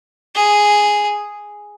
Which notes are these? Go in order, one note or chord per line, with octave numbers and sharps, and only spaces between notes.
G#4